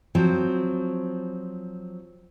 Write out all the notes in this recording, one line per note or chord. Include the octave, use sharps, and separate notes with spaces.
F3 F#3 C4